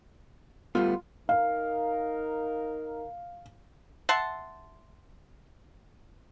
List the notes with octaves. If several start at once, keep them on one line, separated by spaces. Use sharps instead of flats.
G3 A3 B3 F4
D#4 A#4 F5
E5 F#5 A5 C6